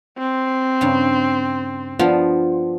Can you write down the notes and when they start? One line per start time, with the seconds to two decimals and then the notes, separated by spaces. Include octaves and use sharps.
0.18 C4
0.81 G2 C#3
1.99 F3 B3 D4 F4